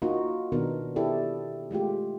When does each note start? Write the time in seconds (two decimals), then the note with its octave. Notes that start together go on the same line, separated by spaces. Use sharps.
0.02 A#3 D#4 F4 F#4
0.52 B2 D#3 B3 D4 D#4 A#4
0.96 E4 G4 A4 D5
1.71 G#3 A3 F4 G4